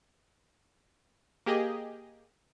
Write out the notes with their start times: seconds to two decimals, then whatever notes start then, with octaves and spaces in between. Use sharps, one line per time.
1.46 A#3 G4 G#4 D#5